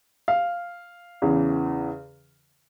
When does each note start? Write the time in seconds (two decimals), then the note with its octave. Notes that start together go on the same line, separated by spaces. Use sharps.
0.28 F5
1.22 E2 C#3 E3